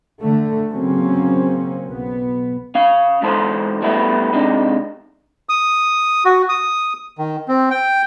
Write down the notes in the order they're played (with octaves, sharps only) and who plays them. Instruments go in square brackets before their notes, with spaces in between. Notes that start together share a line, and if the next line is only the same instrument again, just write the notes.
[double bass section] D3 A3
C#3 F#3 A#3 C4 C#4
B1 B3
[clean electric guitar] C#4 F5
G#2 E3 A4 A#4 C5
G3 A3 B3 E4
C3 G#3 D4 D#4
[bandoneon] D#6
F#4
D#6
D#3
C4
G5